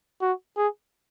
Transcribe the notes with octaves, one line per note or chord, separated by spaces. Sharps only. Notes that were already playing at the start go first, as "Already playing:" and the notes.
F#4
G#4